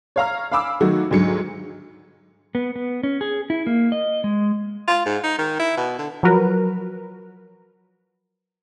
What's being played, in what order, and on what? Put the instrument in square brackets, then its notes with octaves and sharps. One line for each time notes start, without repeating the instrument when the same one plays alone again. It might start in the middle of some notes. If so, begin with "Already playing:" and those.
[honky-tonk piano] C#5 F5 A#5 F6
F5 G#5 B5 D6 E6
D#3 F#3 A3 F#4
D2 G#2 F#3 C#7
[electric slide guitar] B3
B3
C#4
G#4
E4
A#3
D#5
G#3
[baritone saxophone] F4
G#2
D#4
D#3
E4
B2
D3
[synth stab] F3 F#3 F#4 A#4 B4